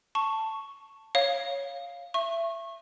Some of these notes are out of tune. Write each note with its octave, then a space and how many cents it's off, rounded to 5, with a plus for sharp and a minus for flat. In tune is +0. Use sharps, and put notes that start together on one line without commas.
A5 +5 C#6 +0
C#5 +0 F5 +0
E5 +25 C#6 -25